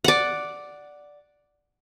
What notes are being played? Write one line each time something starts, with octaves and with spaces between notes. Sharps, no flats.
D5 F#5